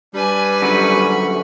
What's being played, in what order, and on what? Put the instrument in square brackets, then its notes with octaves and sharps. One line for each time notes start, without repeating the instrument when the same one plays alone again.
[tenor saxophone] G3 [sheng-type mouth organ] D4 [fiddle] B4 G#5
[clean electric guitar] F#2 D3 [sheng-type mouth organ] B5 C#6